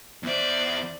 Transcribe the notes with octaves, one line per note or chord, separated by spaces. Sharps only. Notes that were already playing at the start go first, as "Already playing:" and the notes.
E2 C5 D5 E5